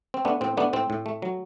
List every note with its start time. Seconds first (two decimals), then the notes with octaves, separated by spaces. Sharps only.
0.14 C4
0.25 A3 B3 D4
0.41 A2 C4
0.57 A3 B3 D4
0.73 A2 C4
0.90 A2
1.06 A3
1.22 F#3